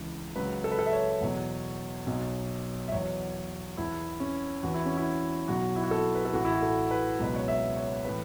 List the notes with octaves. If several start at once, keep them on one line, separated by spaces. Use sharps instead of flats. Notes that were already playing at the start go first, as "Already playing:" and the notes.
Already playing: C#2 C#3 E3
C#2 C#3 F#3 B4
A4
B4
A4
E5
C#5
E2 B2 F#3
B1 B2 F#3
E5
E2 B2 F#3 C#5
E2 E3 E4
C#4
E2 E3 F#4
E4
C#4
E4
B1 B2 F#3 F#4
E4
F#4
A4
B4
A4
A1 A2 E3 F#4
E4
F#4
A4
B4
C#2 B2 F#3 B4
C#5
E5
C#5
A2 E3 B4